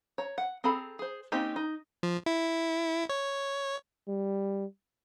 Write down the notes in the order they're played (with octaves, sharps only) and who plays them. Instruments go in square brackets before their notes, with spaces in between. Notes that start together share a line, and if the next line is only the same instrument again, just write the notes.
[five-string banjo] C#5 A#5
F#5
C4 G#4 A4 A#5 B5
G#4 C5
A#3 C4 C#4 D#4 G4
D#4
[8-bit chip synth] F3
E4
C#5
[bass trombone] G3